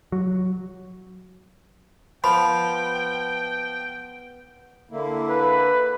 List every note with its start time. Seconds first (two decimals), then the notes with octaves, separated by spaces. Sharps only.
0.12 F#3
2.24 F3 B3 G5 B5
4.91 D3 A#3 E4
5.29 B4